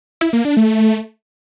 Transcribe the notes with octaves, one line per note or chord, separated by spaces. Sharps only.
E4
A#3
D4
A3